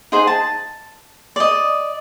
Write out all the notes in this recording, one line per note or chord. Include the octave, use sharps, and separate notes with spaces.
D#4 G#4 C5 F#5
A5
D5 D#5